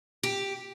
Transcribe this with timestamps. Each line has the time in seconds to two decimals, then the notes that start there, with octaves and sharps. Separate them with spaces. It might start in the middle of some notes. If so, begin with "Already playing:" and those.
0.23 G4